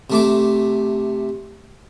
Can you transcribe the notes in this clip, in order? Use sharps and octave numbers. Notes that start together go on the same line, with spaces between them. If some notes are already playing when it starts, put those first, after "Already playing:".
C3 A3 D6